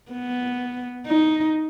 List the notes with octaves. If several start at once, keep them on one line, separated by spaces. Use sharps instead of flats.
B3
D#4